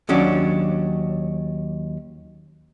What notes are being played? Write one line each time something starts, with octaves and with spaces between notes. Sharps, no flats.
D#2 F#3 C#4 D4